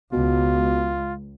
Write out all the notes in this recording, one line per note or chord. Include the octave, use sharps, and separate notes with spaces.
C#2 B2 F4